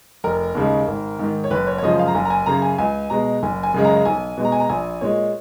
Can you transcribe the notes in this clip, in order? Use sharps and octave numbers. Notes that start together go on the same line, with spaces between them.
F1 A#4
D#2 C#3 G#3
G#1
G#2 D#3
C#5
F#1 B4
C#5
C#5
F#2 C#3 F3 G#3 D#5
F5
A#5
F#1 G#5
A#5
G#5
F#2 C#3 A#5
G#5
C#2 G#5
B2 G#3 A#5
F#1 G#5
G#5
F#2 C#3 G#3
A#5
B1 G#5
B2 G#3
A#5
G#5
A#5
A#1 G#5
A#2 G#3 C#5